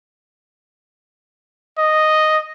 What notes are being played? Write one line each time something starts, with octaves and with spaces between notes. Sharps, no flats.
D#5